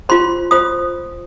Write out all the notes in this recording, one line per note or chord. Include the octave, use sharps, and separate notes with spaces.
F4 C5 C6
F4 C5 D#6